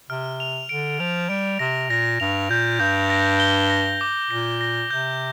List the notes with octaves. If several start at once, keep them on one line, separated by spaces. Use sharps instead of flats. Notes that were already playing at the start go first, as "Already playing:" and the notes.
C3 F6
F7
D3 D7
F3 F7
G3 D7
C3 A#6
A#2 A#6
G2 F7
A#2 G6
G2 G6
A#6
G7
A#6
D6
A#2 A#6
A#6
C3 G6